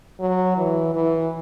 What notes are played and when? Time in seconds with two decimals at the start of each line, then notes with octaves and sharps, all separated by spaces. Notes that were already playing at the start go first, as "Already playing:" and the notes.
0.20 F#3
0.57 E3
0.95 E3